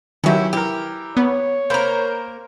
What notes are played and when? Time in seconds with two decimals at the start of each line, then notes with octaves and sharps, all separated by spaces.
0.24 D#3 E3 F#3 C#4 E4 G4
0.53 E3 G4 A#4
1.17 B3 C#5
1.70 A#3 A#4 C5 B5